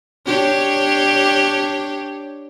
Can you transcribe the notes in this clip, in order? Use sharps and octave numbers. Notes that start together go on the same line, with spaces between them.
D4 G4 C#5